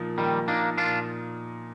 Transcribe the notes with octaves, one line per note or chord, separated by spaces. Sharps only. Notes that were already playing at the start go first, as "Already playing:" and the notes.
Already playing: A#2 F3 D#4
D#3 G3 A#3
A#3 D4 D#4
A#2 D4 F4